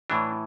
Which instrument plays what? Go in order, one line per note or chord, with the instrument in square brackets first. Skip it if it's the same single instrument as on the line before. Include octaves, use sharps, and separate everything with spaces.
[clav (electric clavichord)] A2 E3 D4